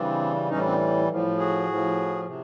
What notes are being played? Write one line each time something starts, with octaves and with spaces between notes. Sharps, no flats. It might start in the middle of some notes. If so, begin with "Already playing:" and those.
Already playing: C#3 E3 G3 C4 D4
A2 E3 G3 C#4 D#4
C4 D4
A2 F3
F#4 G#4
A2 F3
C3